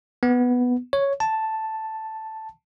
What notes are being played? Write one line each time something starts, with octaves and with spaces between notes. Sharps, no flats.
B3
C#5
A5